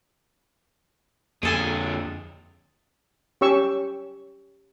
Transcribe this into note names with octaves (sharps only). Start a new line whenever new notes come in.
F2 A#2 D3 G#4 A4 G#5
C#4 G4 C#5 C#6 E6